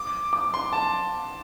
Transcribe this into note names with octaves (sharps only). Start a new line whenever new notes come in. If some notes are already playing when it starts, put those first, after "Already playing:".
Already playing: D6
D6
C6
A5